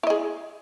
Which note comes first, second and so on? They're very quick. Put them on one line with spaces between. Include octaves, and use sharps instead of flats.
E4 D#5 G#4